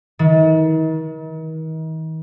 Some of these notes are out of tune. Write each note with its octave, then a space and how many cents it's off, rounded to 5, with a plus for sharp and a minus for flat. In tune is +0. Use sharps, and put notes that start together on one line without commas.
D#3 +40